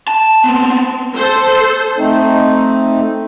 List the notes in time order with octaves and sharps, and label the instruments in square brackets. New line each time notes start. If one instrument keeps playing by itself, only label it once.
[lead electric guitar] A5
B3 C4
[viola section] A4 C5
[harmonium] A3 C4 D#4